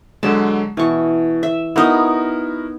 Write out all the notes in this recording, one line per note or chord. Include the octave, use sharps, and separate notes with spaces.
D3 F#3 G#3 A5
B2 E3 C#6
E5
B3 D#4 E4 F#4 A#4